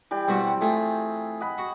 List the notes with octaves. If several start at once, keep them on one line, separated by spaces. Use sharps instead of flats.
E3 G3 G5
B2 G3 C4 F#4
A3 F4 G#4
D#5 F#5 B5
F#4